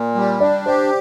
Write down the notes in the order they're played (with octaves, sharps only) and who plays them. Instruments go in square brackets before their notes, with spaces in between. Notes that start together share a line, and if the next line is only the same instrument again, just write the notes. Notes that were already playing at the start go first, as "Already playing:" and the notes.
Already playing: [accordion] A#2
G3
[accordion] D4 [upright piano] D5
[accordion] G4 [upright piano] C5